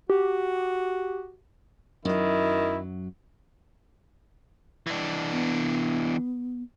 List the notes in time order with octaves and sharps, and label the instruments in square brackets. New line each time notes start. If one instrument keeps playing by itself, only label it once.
[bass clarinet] F#4 [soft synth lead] G4
[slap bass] F#2 F#3 [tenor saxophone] D#3 [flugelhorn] E4
[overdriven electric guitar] E3 D4
[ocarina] B3